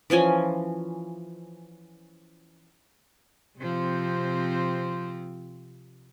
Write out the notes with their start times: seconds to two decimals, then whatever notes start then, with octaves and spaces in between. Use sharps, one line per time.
0.10 E3 F3 C#4 G#5
3.59 C3 F3 C4